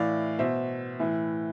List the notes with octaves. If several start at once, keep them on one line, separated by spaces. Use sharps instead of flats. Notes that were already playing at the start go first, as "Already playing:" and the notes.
Already playing: A2 E3 D5 F5
B2 C5 E5
A2 E3